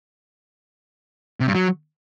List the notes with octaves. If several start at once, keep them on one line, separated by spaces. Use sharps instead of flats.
C3
G2
F#3